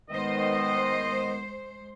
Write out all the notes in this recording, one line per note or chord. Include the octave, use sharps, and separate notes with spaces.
D#3 G#3 B3 C5 D#5